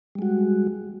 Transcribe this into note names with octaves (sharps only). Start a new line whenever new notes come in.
G3 G#3 F#4